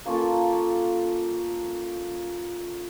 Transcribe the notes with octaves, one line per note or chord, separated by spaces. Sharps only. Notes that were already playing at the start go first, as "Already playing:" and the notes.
A#3 C#4 F4 A4